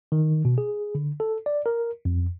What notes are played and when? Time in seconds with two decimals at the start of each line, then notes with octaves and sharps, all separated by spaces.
0.12 D#3
0.45 B2
0.58 G#4
0.95 D3
1.20 A4
1.46 D5
1.66 A#4
2.05 F2